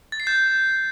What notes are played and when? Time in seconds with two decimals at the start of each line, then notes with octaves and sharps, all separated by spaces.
0.12 A6
0.20 C7
0.27 G6